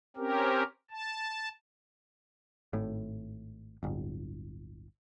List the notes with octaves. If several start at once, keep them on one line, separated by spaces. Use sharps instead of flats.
C4 C#4 G4 A#4
A5
G#1 A2
D1 G1